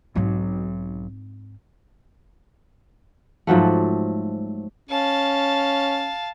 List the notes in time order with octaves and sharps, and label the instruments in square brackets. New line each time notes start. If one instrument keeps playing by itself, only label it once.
[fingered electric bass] B1 F#3 [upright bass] G#2 C4
[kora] G#2 F3 F#3 A3
[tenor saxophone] C#4 [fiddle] F5 A5